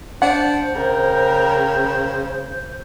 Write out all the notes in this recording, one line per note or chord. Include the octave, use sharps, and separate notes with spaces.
D4 C5 F#5
C#3 A#4 G5